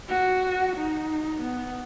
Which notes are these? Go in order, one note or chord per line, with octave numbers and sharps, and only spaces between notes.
F#4
D#4
B3